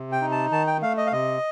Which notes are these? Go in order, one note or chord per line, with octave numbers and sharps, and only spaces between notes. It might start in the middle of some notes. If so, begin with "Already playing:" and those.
Already playing: C3
G5
D#4
A5
D#3 A5
G5
A3 F5
D#5
F5
C3 D#5